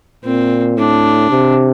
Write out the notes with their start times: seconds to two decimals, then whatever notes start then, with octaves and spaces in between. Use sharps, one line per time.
0.24 A#2 C4
0.77 A2 D4
1.31 C3